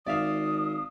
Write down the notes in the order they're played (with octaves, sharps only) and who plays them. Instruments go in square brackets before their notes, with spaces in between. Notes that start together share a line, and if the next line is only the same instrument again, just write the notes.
[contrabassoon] G#1 [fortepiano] D5 E5 F5 [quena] D#6